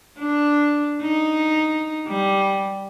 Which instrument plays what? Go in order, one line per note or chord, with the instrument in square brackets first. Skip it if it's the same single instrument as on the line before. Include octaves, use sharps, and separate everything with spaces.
[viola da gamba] D4
D#4
G3